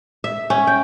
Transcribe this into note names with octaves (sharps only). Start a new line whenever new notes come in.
E5
C#4
G5